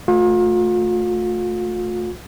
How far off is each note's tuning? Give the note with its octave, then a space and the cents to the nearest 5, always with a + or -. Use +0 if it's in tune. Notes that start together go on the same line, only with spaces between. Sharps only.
A3 +0 F4 +40